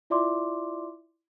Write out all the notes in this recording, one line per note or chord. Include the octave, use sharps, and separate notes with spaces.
E4 F4 D5 E5 C6 D6